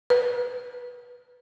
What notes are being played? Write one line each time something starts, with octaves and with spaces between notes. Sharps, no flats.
B4